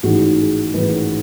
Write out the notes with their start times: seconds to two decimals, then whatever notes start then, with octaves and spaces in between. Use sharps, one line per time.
0.03 A1 G#2 D#3 F#4
0.39 G#4
0.74 A1 G#2 D#3 B4